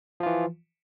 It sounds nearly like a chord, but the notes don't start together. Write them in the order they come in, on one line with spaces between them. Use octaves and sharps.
F3 F4 E3